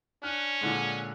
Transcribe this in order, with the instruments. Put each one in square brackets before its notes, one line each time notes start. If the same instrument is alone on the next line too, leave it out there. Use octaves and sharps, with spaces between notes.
[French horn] C#4 [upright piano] D4 F6 F#6
[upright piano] A#2 D3 G#3